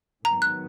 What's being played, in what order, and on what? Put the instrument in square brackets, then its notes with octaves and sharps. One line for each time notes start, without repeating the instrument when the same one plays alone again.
[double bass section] G#2 D#3 F#3 B3 [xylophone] A#5
[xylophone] F#6